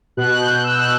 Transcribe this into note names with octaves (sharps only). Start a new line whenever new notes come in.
B2 F#6
F#6
G6
B2 F#6
E6
B2 F#6